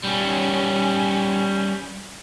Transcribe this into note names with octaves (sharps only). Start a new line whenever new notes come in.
G3 C#4